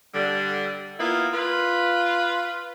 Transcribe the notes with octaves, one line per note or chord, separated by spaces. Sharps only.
D3 G3
A#3 B3 E4 F4
F4 B4